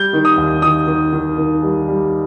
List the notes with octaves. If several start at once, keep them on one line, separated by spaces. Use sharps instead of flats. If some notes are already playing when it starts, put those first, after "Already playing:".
Already playing: G3 G6
D#3
D#6
D#2
D#3 D#6
D#3
D#3
D#3
G3
G3